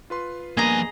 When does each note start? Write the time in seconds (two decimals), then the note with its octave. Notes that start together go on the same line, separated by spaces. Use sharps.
0.10 F4 B4 C6
0.57 G2 F3 A#3 B3 G#4 D#5 G#5 A#5